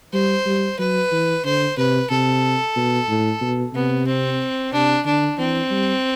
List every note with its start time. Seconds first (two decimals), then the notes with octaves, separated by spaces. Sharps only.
0.14 G3 C5
0.46 G3
0.79 F#3 B4
1.12 E3
1.45 D3 C5
1.77 C3 B4
2.10 C3 A4
2.76 B2
3.09 A2
3.41 B2
3.74 C3 B3
4.07 C4
4.73 C3 D4
5.05 D3 D4
5.38 E3 C4
5.71 G3